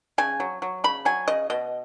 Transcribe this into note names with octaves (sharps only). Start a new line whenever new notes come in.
C#3 G#5
F#3
F#3
C#3 B5
F#3 G#5
C#3 D#5
B2 D#5